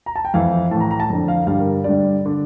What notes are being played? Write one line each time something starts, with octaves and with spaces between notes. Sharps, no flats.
A#5
A5
G5
F2 E3 F5
A2 E3 A5 A#5
A#5
A5
F2 D3
F5
G2 D3 F5
A#4
G2 D3 D5
D3